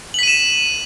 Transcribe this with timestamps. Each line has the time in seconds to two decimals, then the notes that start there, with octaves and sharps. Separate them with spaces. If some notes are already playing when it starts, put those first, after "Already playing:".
0.14 F#7
0.19 B6
0.23 D#7
0.28 E7